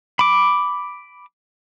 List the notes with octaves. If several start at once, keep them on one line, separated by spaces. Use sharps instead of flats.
B5 D6